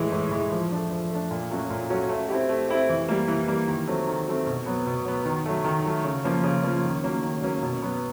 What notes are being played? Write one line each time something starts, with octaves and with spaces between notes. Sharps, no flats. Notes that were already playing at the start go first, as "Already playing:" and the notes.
Already playing: A2 E3 G#3
A2
E3 G#3
F3
A3 D4
F3
A3 D4
A#2
F#3 A3 C#4 F#4
A#2
F#3 A3 C#4 F#4
A3
C4 E4 G4
A3
C4 E4 G4
E3
G3 A#3
E3
G3 A#3
D#3
F#3 A3 C4
D#3
F#3 A3 C4
B2
F#3 B3
B2
F#3 B3
D#3
F#3 A3
D#3
F#3 A3
C#3
F3 A#3 C#4 F4
C#3
F3 A#3 C#4 F4
D#3
F#3 A#3 C#4
D#3
F#3 A#3 C#4
B2
F#3 B3